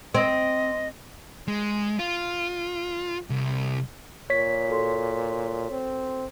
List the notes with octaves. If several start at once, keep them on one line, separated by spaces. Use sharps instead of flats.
C4 D#5
G#3
F4
C2
A#2 C#5 B6
F#4 A4 C6
C4